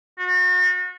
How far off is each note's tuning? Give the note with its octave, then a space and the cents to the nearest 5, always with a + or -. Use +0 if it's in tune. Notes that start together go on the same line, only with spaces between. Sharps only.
F#4 -35